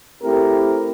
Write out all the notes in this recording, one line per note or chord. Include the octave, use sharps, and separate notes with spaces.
A3 C4 E4 G4 A#4